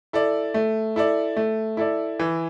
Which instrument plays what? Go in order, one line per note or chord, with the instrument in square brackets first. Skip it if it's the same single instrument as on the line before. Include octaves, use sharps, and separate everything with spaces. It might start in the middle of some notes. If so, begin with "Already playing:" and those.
[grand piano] E4 A4 D5
A3
E4 A4 D5
A3
E4 A4 D5
E3